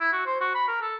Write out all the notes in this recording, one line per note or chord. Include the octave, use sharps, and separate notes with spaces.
E4
F#4
C5
F#4
B5
A#4
A4